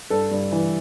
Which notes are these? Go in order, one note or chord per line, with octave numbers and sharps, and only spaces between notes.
G2 A4
G2
E3